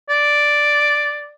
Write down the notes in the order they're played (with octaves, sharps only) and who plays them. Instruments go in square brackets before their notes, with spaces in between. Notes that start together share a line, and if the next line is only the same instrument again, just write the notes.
[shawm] D5